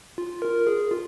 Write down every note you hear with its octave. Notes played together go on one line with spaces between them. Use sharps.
F4
A#4
G#4
F4